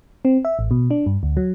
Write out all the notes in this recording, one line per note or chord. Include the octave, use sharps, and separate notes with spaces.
C4
E5
A1
B2
D4
G2
D2
F#3